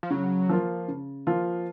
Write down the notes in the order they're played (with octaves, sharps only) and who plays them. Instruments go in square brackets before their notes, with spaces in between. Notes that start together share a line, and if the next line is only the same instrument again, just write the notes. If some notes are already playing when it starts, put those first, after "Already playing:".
[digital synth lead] F3
[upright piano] C#3 [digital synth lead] F#3
[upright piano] F3 A#3 F4
C#3
F3 A#3 F4